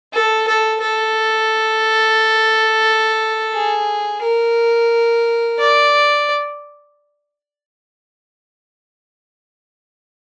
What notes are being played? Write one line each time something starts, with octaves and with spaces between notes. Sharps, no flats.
A4
A4
A4
G#4
A#4
D5